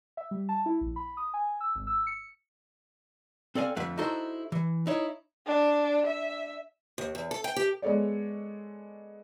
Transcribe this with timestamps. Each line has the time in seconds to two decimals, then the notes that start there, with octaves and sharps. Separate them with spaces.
0.17 E5
0.31 G3
0.49 A5
0.66 E4
0.81 A#1
0.96 B5
1.17 D#6
1.34 G#5
1.61 E6
1.75 G#1
1.87 E6
2.07 C#7
3.55 C4 A4 D5 F5 G#5
3.76 F2 D3 A3 F#5
3.98 D#4 E4 F#4 A4 C5
4.52 E3
4.87 D#4 E4 C#5
5.46 D4
6.06 E5
6.98 D#2
7.15 E2
7.31 A4
7.44 G5
7.56 G4
7.82 G#3 B3 A4 C#5 D5